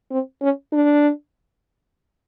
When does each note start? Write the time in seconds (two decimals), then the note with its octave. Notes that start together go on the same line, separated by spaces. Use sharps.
0.11 C4
0.42 C#4
0.72 D4